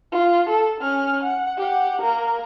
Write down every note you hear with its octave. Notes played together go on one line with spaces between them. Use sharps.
F4
A4
C#4 F6
F#5
G4 F#5
A#3 A#4